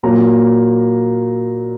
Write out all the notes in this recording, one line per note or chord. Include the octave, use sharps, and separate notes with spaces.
A#2 F#3 A#3 A#5